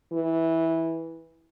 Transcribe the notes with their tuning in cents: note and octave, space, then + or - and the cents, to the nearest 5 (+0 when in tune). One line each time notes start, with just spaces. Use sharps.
E3 -10